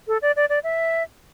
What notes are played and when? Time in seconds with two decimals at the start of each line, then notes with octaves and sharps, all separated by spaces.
0.08 A4
0.22 D5
0.36 D5
0.49 D5
0.64 E5